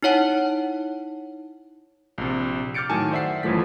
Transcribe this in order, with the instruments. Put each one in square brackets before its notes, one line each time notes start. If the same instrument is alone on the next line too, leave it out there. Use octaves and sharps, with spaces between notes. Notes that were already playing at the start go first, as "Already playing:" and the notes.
[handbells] D#4 E4 C#5 F#5 A5
[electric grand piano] A#1 C3
D6 F6 G6 A6 C#7 D7
A2 D#3 F#3 G#5 A5
C5 D5 E5 F#5 C7
G1 F#2 E3 F3 A3 B6